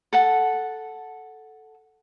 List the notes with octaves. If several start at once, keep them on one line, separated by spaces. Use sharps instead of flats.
A4 F#5 A5